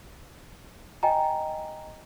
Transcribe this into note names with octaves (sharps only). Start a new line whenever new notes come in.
D#5 G5 G#5 A#5